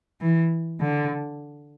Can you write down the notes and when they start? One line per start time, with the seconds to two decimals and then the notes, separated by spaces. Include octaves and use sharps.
0.21 E3
0.80 D3